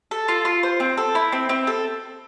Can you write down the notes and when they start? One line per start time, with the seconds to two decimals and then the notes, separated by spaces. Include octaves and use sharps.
0.11 A4
0.28 F4
0.45 F4
0.63 C5
0.80 C4
0.97 A4
1.15 E4
1.32 C4
1.49 C4
1.67 A4